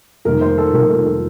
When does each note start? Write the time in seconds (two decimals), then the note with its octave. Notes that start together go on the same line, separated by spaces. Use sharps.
0.25 F1 F2 D#3 G3 A#3 A#4
0.41 C5
0.58 A4
0.73 F1 F2 D#3 G3 A#3 A#4
0.89 A4
1.06 A4